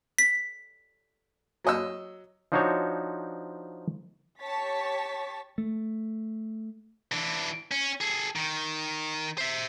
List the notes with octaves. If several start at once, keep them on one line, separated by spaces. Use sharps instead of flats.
B6
F#3 D#5 E6
F3 D4 D#4 F#4 C5 C#5
G4 C#5 A5 C#6 A6 B6
A3
E3 D4
C#4
G#4 A4
D#3
C5 E5